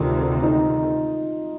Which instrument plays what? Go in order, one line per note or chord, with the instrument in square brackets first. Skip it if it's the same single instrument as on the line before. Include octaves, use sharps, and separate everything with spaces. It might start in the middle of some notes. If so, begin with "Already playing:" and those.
Already playing: [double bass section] D2 C3 D#3 [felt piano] F4
[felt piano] D#4